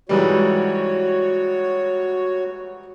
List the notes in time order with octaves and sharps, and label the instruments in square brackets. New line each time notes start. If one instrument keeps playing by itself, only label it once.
[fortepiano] G#2 E3 G3 [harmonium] F#4 C#5